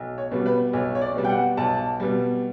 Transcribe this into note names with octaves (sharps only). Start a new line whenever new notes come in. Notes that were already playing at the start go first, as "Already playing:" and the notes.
Already playing: B1
C#5
B2 G3
B4
B1 C#5
C#5
D5
B2 G3
G5
F#5
B1 A5
B2 G3